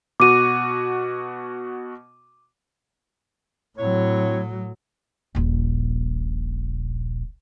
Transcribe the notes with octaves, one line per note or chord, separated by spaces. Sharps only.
B2 F#4 D6 D#7
A2 F#3 C4 E4 C#5
D#1 A#1